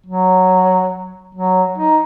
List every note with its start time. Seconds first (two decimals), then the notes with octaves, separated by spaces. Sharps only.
0.07 F#3
1.35 F#3
1.78 D#4